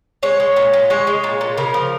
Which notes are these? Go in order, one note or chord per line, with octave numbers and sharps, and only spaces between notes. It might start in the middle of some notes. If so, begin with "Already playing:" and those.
G#3 C#5
G#3
A#2
A#2
G#3 C#5
G#3
A#2
A#2
C#3 A#4
F3